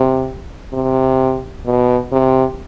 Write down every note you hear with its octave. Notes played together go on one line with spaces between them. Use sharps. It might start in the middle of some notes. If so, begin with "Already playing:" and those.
Already playing: C3
C3
B2
C3